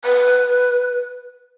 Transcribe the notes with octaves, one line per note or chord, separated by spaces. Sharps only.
B4